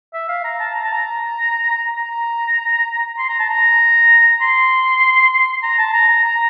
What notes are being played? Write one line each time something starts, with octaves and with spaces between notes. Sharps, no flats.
E5
F5
A#5
A5
A#5
A5
A#5
A#5
C6
A#5
A5
A#5
C6
A#5
A5
A#5
A#5
A#5